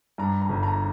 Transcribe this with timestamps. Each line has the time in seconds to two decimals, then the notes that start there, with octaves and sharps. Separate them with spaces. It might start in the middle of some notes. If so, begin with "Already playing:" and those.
0.18 G2 A#5
0.42 A#5
0.49 G1
0.63 A#5